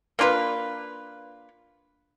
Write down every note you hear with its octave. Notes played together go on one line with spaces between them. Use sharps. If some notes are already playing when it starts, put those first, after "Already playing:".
A#3 D4 F4 B4